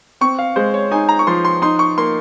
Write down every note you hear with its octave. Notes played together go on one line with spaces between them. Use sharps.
C4 C#6
F5
G#3 C5
C#5
D#4 G#5
A#5
C#6
F3 C6
C6
D#4 C6
C#6
A#3 C6